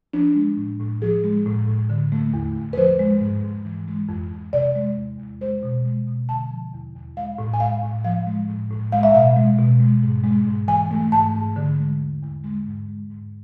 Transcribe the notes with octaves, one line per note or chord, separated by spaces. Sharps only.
F3 D4
G#3
A2
A2
F3 G#4
G#3
A2
A2
D3
A3
E2
E2
B4
F3 C5
G#3
G#2
G#2
E3
G#3
F2
F2
C3 D5
G#3
E2
E2
G#3 C5
B2
G#3
B2
D3 A5
F3
E2
E2
G#3 F5
A2
G#5
G#3 F5
A2
F3 F5
G#3
A2
A2
G#3 F5
E5
B2 F5
G#3
B2
G#3
G#2
G#3
G#2
E3 G#5
A3
G#2 A5
G#2
D3
G#3
E2
E2
G#3
G#2
G#3
G#2